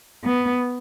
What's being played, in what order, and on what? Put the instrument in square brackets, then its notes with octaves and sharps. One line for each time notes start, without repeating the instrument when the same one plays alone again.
[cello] B3